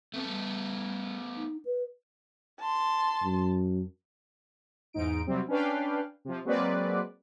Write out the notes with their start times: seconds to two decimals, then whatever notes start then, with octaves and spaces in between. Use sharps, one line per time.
0.14 A3 B3 C4 A4
0.29 G3
1.36 D#4
1.65 B4
2.59 A5 C6
3.23 F#2
4.93 E2 G#2 D#4 D7
5.27 C3 F#3 G3 C4
5.48 C#4 D4 B4 F5 G5
6.25 C3 F3
6.45 F#3 G#3 A#3 C4 B4 D5